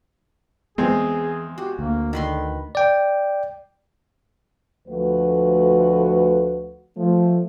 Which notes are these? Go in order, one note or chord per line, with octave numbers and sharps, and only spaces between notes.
E2 E3 G#3 B3 C4 G#4
F#4 G4
D2 A#3
D3 D#3 B4 C6
D5 G5
D2 F3 A3 F#4 B4
F3 A3